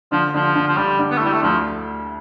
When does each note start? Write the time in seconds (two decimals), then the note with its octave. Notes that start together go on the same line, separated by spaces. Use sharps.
0.12 D3 F3
0.34 D3 F3
0.55 D3
0.68 F3
0.77 D3 G3
0.99 D3
1.11 B3
1.18 A3
1.21 G3 E4
1.33 A3
1.43 D2 F3